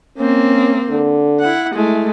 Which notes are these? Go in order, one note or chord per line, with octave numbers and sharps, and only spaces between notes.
A#3 C4 C#4
D3
E4 F#5
G#3 A3 E4